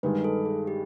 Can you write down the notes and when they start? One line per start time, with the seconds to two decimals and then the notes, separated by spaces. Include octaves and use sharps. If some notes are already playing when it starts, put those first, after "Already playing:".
0.03 G2 D#3 G#3 B4
0.24 A4
0.45 G#4
0.67 G4